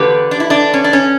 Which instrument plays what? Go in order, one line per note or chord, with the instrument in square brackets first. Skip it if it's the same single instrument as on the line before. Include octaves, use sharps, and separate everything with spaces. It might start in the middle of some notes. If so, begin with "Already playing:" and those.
Already playing: [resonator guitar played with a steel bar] E2 D3 A#3 G4 B4
D4
E4
D4
C#4
D4
C#4